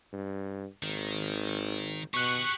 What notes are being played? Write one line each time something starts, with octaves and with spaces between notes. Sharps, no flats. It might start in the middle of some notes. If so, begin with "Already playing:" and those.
G2
G#1 D#3
B2 G4 G#4 C#6 F#6